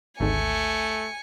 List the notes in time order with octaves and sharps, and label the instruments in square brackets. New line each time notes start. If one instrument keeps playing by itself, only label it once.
[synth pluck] G#1 D2 G#2 [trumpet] A3 [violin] G#5 C#7